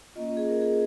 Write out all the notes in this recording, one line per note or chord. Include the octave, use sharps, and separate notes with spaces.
A#3 C#4 F4 D#5
G#4
A#4
G#4